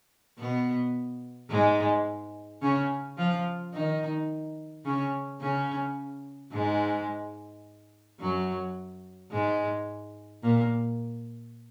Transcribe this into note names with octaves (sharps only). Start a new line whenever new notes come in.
B2 B3
G#2 G#3
C#3 C#4
F3 F4
D#3 D#4
C#3 C#4
C#3 C#4
G#2 G#3
F#2 F#3
G#2 G#3
A#2 A#3